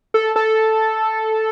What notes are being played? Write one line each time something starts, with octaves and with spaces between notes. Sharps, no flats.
A4
A4